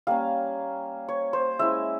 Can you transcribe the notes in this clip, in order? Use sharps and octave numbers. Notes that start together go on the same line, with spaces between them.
G3 A#3 C#4 F5
C#5
C5
G#3 C#4 E4 E5